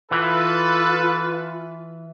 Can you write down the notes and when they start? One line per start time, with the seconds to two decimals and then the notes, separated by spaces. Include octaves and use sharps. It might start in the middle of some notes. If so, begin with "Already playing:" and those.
0.11 E3 F4 A4 B4